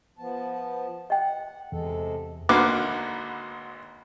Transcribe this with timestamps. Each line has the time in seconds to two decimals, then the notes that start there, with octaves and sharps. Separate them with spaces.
0.19 F3 B3 A5
1.10 D#5 F#5 G5
1.72 E2 C3 G#3 A4
2.49 G#1 D2 D3 A#3 B4 D6